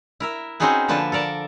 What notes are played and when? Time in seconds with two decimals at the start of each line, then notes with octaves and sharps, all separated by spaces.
0.20 E4 A#4 E5
0.60 C4 C#4 D#4 F#4 G#4 B4
0.88 D3 F3 A#3 B4 A5
1.12 A4 A#4 D5 A5